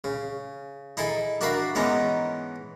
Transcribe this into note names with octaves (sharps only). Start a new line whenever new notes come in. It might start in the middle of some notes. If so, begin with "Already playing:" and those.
C#3
D#4 E4 G#4 A4
D4 F#4 A#4 E5 F5 B5
G#2 E3 B3 C#4 D#4 A#5